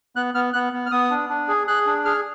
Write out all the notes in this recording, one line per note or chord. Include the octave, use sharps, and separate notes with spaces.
B3 F#6
B3 F6
B3 F#6
B3
F6
B3 D#6
D4
D4
G#4
G#4 F#6
D4
G#4 F6